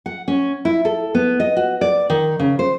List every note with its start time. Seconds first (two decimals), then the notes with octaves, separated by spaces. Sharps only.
0.06 F#5
0.28 C#4
0.65 E4
0.85 A4
1.15 B3
1.40 D#5
1.56 F#4
1.81 D5
2.10 D#3
2.39 C#3
2.59 C5